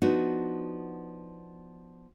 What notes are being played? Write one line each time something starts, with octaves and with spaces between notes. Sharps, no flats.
F3 B3 D4 D#4 F#4